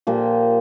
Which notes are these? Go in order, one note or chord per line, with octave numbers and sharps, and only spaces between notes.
A#2 F3 A#3 G4